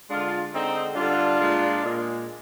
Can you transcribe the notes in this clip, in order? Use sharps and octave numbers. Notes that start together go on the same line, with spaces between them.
D3 G#3 D4 F4
D3 G#3 C4 D#4
D3 G3 D4 F4
A#2 G#3
A#2 G#3